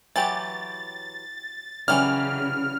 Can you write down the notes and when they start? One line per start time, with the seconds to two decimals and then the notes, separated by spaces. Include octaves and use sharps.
0.16 E3 F#3 G4 A6
1.88 C#3 E3 F#3 G3 F6